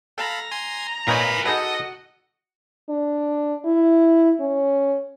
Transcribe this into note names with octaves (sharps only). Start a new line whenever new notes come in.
A4 F5 A#5 B5
G#5 C6 G#6
A#2 D#4 A#4 B4 C#5 G#5 B5
D#4 F#4 G#4 A4 B4 D#5
D4
E4
C#4